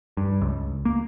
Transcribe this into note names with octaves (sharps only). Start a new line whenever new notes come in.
G2
C#2
A#3